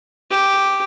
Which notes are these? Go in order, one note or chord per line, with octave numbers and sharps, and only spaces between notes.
G4